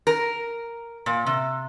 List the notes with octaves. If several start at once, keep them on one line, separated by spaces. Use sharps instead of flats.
A#4
A#2
C3